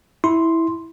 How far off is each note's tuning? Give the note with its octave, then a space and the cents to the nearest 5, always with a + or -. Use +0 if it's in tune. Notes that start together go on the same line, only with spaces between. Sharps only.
E4 -10 C6 +0